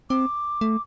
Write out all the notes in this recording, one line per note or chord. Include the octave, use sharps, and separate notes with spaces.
C4 D6
A3